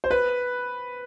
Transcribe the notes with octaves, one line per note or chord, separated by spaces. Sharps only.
C5
B4